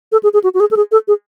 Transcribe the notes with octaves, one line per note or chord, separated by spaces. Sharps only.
A4
G#4
G#4
F#4
F#4
G#4
A4
G#4
A4
G#4